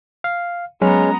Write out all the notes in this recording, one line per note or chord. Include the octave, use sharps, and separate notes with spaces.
F5
F#3 G#3 B3 C#4 A#5 F7